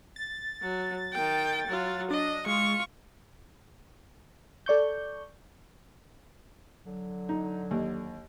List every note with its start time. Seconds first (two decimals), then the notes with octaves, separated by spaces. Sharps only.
0.16 A6
0.62 F#3
1.13 D#3 G5
1.67 F#3 F4
2.10 D4 D#5
2.46 G#3 F4 C#6
4.66 A4 D5 C#6 G6
6.85 D3 F#3
7.29 D#4
7.71 D#2